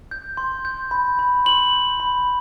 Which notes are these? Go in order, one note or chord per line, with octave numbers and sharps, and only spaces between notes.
G6
C6
G6
B5
B5
C6 F#7
G6
B5